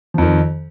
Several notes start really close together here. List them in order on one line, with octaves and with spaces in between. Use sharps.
F3 F2 D#3